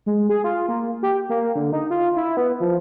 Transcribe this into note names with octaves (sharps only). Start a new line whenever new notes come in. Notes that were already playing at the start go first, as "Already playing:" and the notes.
G#3
G#4
F4
A#3
G4
A#3
D3
D#4
F4
E4
B3
F3